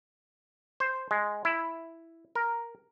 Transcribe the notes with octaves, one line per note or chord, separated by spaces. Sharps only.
C5
G#3
E4
A#4